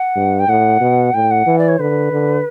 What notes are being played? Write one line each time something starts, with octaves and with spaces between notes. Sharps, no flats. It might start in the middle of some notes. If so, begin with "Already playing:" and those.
Already playing: F#5
G2
G5
A2 F#5
B2
A2 G5
F#5
E3
D5
C#5
D3 B4
D3